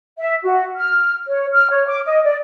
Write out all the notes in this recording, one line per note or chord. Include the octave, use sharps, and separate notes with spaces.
E5
F#4
F6
C#5
F6
C#5
D6
D#5
D5